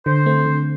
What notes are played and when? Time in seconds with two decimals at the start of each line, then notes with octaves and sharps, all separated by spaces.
0.06 D3 C5
0.26 A3 C4
0.46 D3